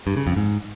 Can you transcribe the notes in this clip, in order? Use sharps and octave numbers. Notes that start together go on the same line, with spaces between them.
G2
C#3
F2
G#2